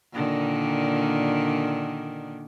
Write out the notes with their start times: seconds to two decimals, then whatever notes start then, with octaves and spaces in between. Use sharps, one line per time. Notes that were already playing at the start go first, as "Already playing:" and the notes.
0.13 A#2 D3 D#3